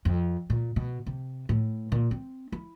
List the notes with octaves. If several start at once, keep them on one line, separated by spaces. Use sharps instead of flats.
F2
A#2
B2
C3
A2
A#2
C4
E4